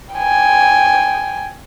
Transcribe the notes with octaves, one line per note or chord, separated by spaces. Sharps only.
G5 G#5